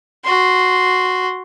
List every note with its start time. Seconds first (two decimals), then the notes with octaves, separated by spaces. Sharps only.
0.24 F#4 C6